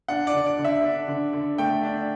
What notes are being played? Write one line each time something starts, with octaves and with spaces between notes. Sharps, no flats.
D4 F#5
D5
D3
D5
D3
E5
D4
D3
D3
A3 G5
D4